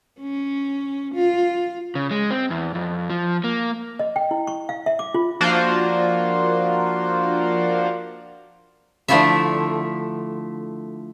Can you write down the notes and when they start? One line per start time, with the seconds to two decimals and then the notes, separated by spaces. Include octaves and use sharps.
0.20 C#4
1.15 F4
1.95 C#3
2.11 G#3
2.31 C4
2.50 E2
2.75 F2
3.10 F3
3.44 A#3
3.99 D#5
4.16 G5
4.31 E4
4.47 C#6
4.69 F5
4.86 E5
4.99 D6
5.14 F4
5.41 F3 A#3 D4 F4 F#4 C5
9.08 D3 F3 A3 E4 F4 E5